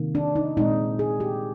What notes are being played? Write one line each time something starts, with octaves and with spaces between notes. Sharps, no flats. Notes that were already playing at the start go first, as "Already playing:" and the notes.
Already playing: C3 D#3 A#3
D4
D#4
A#2 G#3 C4 D#4
G#4
G4